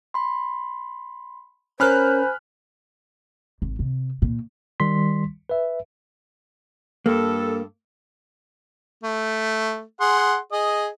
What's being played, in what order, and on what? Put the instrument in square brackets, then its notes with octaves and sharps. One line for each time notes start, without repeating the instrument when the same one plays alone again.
[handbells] B5 C6
[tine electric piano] C#4 A#4 [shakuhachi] C5 [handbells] G#5 [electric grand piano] B5 F6 F#6
[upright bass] G#1
C3
A#2
[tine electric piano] D#3 G3 C6 B6
B4 E5
[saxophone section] G2 A4 [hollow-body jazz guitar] A#3
[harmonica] A3
G#4 F#5 C6
G#4 D#5